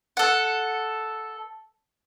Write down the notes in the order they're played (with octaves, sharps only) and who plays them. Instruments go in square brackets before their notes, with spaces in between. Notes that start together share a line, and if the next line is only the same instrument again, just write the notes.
[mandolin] A4 F#5